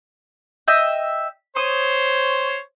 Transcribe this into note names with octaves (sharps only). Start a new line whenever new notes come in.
D#5 E5 G5
C5 C#5 D#6